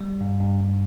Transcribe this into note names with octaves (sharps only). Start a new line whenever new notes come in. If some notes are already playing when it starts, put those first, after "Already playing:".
G3
G2
G2
G2